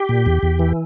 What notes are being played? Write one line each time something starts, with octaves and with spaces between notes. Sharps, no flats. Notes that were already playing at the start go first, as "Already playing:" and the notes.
Already playing: G4
A#2
E2
E2
E3